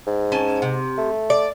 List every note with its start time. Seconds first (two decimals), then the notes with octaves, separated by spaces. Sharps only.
0.07 G#2
0.32 C#4 G#5 A5
0.62 C3
0.98 A3
1.30 D5